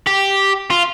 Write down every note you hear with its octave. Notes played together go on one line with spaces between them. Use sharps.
G4
F4